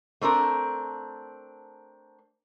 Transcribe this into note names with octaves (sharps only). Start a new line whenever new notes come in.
A3 C4 D4 A#4